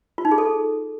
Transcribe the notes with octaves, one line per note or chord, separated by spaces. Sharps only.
F4
D#4
G#4
A4